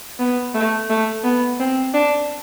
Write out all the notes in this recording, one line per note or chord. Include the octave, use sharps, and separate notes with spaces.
B3
A3
A3
B3
C4
D4